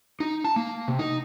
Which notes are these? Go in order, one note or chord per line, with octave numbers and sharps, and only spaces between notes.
D#4
A5
A#3
C3
D#4